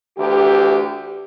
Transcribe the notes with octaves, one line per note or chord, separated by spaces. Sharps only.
D2 E3 G4